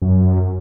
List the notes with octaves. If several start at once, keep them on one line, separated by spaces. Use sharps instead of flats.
F#2